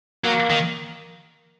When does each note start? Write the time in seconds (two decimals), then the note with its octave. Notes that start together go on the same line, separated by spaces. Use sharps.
0.24 F#3 A#3
0.50 D#3